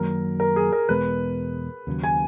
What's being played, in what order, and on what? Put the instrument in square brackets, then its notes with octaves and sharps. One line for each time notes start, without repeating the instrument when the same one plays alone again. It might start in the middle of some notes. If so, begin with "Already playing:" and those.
Already playing: [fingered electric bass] F#2 D#3 F#3 A#3 [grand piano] A#4
[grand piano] A#4
G#4
A#4
[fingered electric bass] E2 B2 G#3 B3 [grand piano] B4
[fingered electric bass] D#2 C#3 F#3
[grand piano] G#5